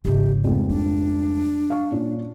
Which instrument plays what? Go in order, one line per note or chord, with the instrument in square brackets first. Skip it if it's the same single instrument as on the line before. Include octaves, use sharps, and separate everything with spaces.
[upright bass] G#1 C#3 [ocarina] G4
[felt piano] F1 C#2 C4 [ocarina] B3
[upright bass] G3 [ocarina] D4
[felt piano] F5 C#6
A#2 C#4 F4